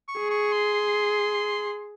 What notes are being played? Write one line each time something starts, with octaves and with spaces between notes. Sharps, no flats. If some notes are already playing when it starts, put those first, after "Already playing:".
C#6
G#4
C#6
C6